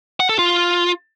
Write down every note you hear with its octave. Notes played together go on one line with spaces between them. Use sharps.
F#5
A4
F4